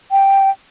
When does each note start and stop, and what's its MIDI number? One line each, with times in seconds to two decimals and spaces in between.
0.11 0.50 79